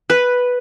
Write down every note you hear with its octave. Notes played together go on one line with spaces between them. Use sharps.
B4